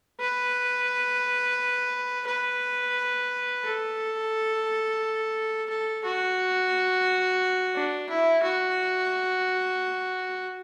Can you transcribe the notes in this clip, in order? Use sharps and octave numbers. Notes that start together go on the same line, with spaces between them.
B4
B4
A4
A4
F#4
D4
E4
F#4